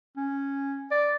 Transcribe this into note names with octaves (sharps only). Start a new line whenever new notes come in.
C#4
D5